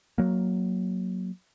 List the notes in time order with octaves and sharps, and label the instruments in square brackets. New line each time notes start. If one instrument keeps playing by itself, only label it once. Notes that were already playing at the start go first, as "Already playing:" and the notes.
[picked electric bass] F#3 A#3